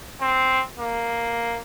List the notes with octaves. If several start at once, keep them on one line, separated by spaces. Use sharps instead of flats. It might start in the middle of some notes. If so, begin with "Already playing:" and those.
C4
A#3